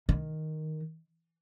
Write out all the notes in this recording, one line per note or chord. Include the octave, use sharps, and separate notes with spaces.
D#3